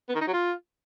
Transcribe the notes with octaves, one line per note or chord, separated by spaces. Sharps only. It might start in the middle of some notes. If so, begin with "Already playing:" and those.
B3
D#3
D#4
F#3
F4